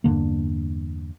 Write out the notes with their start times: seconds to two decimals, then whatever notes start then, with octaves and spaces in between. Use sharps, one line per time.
0.04 E2 G2 D3 A#3